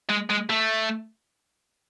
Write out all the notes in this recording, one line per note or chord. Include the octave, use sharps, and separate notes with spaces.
G#3
G#3
A3